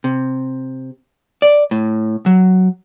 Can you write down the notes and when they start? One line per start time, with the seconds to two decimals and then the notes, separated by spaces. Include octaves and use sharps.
0.04 C3
1.42 D5
1.71 A2
2.26 F#3